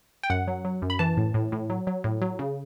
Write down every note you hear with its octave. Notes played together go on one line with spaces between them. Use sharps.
G5
F#2 F#5
F#3
F#3
F#2
B5
E3 A5
A2
A2
A2
F#3
F#3
A2
F#3
C#3